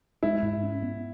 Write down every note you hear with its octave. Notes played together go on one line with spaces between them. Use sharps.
G#3 E4
G#2
C#4
B3